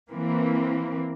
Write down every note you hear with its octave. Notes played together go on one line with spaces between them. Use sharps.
E3 A#3 C4